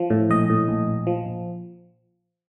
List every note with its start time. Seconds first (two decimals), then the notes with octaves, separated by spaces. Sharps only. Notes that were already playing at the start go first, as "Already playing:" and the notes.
Already playing: F3
0.10 A2
0.30 A#1 D#5
0.50 A2
0.68 A#1
0.87 A#1
1.07 F3
1.26 A#1